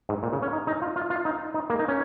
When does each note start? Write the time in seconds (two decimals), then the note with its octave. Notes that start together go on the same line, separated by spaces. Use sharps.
0.09 G#2
0.23 A#2
0.33 C#3
0.42 C#4
0.53 D#4
0.67 D#4
0.82 F4
0.96 F4
1.10 F4
1.25 D#4
1.54 D#4
1.70 A#3
1.79 D#4
1.88 C#4